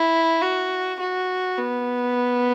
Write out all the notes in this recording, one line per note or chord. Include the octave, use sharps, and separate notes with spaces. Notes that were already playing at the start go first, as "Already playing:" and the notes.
Already playing: E4
F#4
F#4
B3